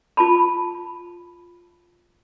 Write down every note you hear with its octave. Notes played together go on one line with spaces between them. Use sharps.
F4 A5 B5